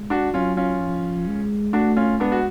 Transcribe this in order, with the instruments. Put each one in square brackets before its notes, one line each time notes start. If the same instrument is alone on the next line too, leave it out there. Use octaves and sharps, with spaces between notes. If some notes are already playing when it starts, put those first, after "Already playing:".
Already playing: [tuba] G#3
[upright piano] D4 F#4
[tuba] F#3 [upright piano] C#4 F4
[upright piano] C#4 F4
[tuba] F3
G#3
[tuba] A3 [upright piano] D4 F#4
[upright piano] C#4 F4
[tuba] G#3 [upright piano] B3 D4
[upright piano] F#4